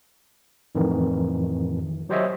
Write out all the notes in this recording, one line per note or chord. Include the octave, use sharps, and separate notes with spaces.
F2 A2 D#3 E3
F#3 G4 C5 C#5 D#5 E5